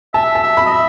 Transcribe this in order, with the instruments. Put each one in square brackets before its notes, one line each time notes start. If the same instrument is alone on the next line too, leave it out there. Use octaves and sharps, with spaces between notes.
[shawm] E5 [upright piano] A5
[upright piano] A5
[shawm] E5
[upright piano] B5
[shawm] D#5
E5